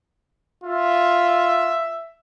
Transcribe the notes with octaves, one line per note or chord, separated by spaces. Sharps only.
F4 E5